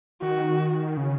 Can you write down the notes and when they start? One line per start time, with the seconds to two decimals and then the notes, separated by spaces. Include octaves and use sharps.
0.22 D#3 F#4
0.97 C#3